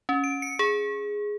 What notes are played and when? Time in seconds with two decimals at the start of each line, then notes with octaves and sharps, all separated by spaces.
0.09 C#4
0.24 D7
0.42 C#7
0.59 G#4